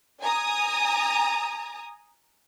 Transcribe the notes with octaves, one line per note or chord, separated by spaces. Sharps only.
G#5 A#5 D#6